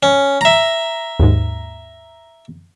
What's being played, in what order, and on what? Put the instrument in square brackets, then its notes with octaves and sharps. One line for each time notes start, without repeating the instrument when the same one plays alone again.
[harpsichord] C#4
E5 A#5
[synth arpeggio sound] D#2 G#2